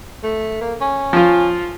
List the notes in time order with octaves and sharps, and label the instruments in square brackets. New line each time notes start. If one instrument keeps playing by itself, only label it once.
[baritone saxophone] A3
A#3
C#4
[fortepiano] F3 F4